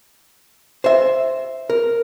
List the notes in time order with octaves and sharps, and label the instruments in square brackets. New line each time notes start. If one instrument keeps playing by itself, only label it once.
[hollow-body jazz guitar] C5 E5
A#4